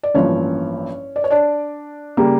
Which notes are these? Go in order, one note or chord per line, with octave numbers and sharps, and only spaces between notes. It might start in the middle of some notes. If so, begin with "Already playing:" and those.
D5
A1 G2 F3 A#3 C#4 C#5
D5
C#5
D4 D5
C#3 G3 A#3